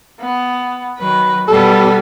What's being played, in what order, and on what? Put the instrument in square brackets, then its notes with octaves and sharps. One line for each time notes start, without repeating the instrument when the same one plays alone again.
[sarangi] B3
[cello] D#3 F#3 [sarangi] B4
[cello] B2 B3 [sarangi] G3 [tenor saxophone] A4